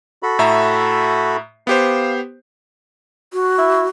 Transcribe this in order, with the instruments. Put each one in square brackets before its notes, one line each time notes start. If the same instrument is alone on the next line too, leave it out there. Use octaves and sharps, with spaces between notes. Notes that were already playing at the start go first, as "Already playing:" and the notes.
[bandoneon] F#4 A4 B5
[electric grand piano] A2 E5 A#5
[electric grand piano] B3 G4 C5 [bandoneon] F5
[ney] F#4
[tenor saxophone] E4